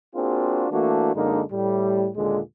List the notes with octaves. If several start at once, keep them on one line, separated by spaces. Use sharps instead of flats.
A#3 C4 D4 F4 F#4 G#4
E3 A3 A#3 D4 F#4
F#2 D3 G#3 A#3 D4 D#4
A2 G3
D#2 A#2 D3 G#3